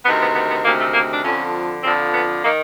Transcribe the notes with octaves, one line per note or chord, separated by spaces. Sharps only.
D2 C3 D#3 B3
B3
B3
B3
D2 C3 D#3 A#3
A3
A#3
D4
F2 D3 F3 C#4
F2 D3 F3 C4
B3
D#3 A#3